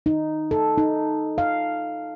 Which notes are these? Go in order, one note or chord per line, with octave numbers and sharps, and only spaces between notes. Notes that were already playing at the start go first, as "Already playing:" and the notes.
D#4
A4
D#4
F5